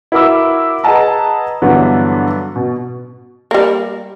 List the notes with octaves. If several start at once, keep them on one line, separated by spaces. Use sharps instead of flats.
E4 F#4 A#4 B5 D6 E6
G#4 B4 D#5 F#5 A5 A#5
G2 D3 E3 F#3 B3
B2
G3 A#3